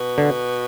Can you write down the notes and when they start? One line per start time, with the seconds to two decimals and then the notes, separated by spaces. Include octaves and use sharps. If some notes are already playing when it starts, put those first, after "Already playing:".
Already playing: B2
0.18 D3